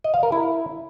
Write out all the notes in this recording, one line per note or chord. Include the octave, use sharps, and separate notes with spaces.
D#5
F5
A#4
E4